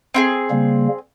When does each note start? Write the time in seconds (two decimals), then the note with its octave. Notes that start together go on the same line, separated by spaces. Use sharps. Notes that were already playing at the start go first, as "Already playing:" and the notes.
0.14 C4 E4 G#4
0.50 C#3 G3 A#3